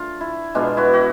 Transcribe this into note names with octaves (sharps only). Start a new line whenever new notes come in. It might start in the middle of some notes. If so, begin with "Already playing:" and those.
Already playing: A3 D4 F4
E4
B2 G#3 B3 D4 F4
E4 F#4
F#4